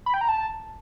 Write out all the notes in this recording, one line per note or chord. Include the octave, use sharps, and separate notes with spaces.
B5
G5
A#5
A5